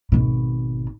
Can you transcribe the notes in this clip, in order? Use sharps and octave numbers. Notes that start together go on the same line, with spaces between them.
G#1 B2